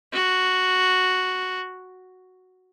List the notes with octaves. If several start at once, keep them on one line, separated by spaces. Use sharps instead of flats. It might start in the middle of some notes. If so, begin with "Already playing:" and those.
F#4